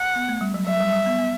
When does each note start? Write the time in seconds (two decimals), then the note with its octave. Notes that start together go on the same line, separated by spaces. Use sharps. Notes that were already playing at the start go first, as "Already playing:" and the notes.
Already playing: F#5
0.16 B3
0.28 A3
0.41 G3
0.54 F#3
0.67 F#3 E5
0.80 G3
0.93 G3
1.06 B3
1.19 B3